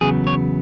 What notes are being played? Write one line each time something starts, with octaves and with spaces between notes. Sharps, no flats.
E2 C#3 F#3 B3 G#4
C#5